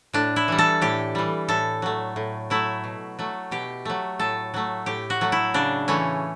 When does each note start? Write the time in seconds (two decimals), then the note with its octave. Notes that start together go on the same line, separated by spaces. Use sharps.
0.13 A2 D4
0.36 E4
0.48 E3 G3
0.58 A4
0.82 A2 G4
1.15 E3 G3
1.49 A2 A4
1.82 F#3 A3
2.16 A2
2.50 F#3 A3 E4
2.84 B2
3.19 F#3 A3
3.51 B2 G4
3.85 F#3 A3
4.19 A2 A4
4.54 F#3 A3
4.86 A2 G4
5.10 F#4
5.21 F#3 A3
5.32 E4
5.54 C#3 D4
5.88 E3 A3 C#4